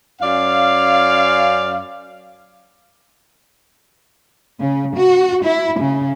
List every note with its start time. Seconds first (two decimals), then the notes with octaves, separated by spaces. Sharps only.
0.21 F#2 C#4 D5 F5
4.59 C#3
4.97 F#4
5.45 E4
5.80 C#3